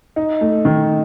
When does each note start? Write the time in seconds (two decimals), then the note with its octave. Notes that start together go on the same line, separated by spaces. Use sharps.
0.16 D#4
0.41 A3
0.65 D#3